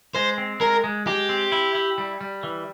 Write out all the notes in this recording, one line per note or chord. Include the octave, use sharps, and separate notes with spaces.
G#3 C5
C4
G#3 A#4
G#3
G#3 G4
C4
E4
E4
G3
G3
E3